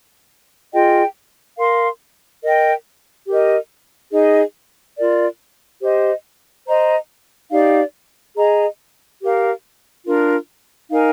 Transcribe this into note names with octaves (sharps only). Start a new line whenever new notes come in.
F4 G#4 D#5 G5
A#4 F5 C6
A#4 D#5 G5
G4 A#4 D#5
D#4 G#4 D#5
F4 A#4 D5
G4 C5 D#5
C5 D#5 A#5
D#4 G4 D5 F5
G#4 D#5 A#5
G4 A#4 F5
D4 F4 A#4
D#4 A#4 F5 G#5